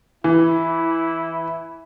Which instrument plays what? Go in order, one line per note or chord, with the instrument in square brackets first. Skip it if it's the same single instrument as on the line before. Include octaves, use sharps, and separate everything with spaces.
[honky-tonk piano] E3 [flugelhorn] E4